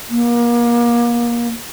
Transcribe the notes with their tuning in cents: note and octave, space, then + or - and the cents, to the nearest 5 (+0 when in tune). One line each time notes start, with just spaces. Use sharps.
A#3 +30